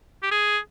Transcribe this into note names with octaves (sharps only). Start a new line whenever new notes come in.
G4
G#4